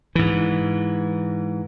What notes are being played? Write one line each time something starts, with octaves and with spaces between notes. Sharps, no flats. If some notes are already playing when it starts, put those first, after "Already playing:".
G#2 E3